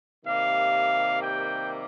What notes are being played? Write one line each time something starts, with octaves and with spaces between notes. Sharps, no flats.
C3 D#3 G3 A#3 F5
G5